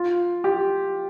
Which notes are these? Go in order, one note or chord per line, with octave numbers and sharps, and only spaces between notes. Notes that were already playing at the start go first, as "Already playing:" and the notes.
Already playing: F4
G4